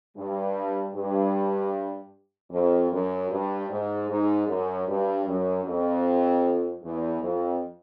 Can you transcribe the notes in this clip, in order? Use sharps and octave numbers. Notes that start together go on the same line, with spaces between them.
G2
G2
F2
F#2
G2
G#2
G#2
F#2
G2
F#2
F2
E2
F2